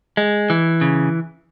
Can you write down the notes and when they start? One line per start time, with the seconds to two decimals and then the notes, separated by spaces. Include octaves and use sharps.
0.17 G#3
0.50 E3
0.81 C#3